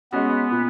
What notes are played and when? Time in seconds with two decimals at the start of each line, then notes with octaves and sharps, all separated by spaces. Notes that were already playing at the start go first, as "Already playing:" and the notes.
0.12 G#3 B3 C#4 F#4
0.51 A#2